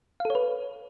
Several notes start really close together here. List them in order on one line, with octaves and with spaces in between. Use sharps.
F5 A4 C#5 B4